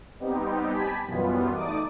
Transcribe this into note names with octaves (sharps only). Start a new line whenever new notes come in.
G3 B3 C4 D#4 G4
G4 G#5 A5 B5 B6
F#2 B2 E3 G3 B3 F4
A3 D#4 D5 D6 D#6